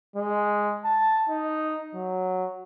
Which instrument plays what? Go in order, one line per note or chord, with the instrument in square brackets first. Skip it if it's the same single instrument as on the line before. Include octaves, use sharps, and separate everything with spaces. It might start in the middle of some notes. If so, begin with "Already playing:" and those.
[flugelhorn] G#3
A5
D#4
F#3